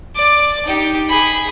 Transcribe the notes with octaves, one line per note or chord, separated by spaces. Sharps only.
D5 D6
D#4 G4
G#4 B5